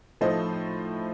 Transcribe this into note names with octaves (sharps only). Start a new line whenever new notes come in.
A2 F3 A3 D#4 C5 D#5